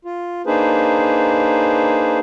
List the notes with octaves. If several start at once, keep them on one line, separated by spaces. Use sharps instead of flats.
F4
A#3 D4 D#4 G#4 B4 C5